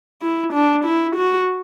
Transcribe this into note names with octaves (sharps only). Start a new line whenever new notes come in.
E4
D4
E4
F#4